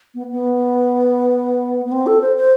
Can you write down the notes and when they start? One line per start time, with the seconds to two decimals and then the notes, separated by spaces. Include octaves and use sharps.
0.14 B3
0.31 B3
1.85 B3
1.92 C4
2.06 A4
2.21 C5
2.36 C5